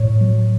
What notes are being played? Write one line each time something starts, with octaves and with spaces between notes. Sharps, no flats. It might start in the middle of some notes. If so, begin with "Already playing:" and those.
Already playing: A2 C#5
F#3